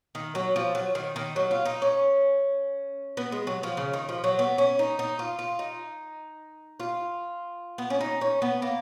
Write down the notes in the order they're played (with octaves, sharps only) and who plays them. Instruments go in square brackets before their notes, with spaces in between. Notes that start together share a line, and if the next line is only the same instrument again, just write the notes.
[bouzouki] D#3
F#3
F3
F#3
D#3
D#3
F#3
F4
D#4
C#4
B3
G#3
F#3
F3
C#3
D#3
F3
F#3
B3
C#4
D#4
D#4
F4
F4
D#4
F4
B3
C#4
D#4
C#4
B3
A#3